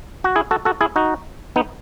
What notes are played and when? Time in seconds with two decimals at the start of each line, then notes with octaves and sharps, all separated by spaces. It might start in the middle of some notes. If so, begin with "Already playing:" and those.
0.24 F#4
0.36 E4 G#4
0.51 F#4 A4
0.65 F#4 A4
0.81 E4 G#4
0.96 D#4 F#4
1.56 B3 D#4